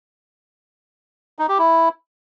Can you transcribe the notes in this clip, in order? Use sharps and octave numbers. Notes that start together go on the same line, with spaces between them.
D#4
G4
E4